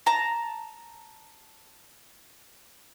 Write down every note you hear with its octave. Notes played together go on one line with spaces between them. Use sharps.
A5 A#5